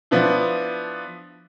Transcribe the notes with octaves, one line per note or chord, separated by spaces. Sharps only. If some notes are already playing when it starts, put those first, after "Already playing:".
F3 B3 D4 E4